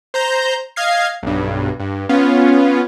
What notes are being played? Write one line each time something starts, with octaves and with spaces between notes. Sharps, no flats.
C5 A#5 G6
D#5 F5 G#6 C7
B1 G2
G2
B3 C#4 F4